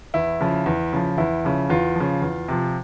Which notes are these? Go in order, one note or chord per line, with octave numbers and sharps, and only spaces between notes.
E2 E4
C#3 F3
E2
C#3 F3
E2 E4
C#3 F3
E2 F4
C#3 F3
E2
C3 F3